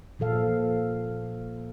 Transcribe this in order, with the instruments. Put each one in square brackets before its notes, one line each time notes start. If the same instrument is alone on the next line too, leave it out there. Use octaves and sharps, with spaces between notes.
[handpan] A#2 F3 A4 F5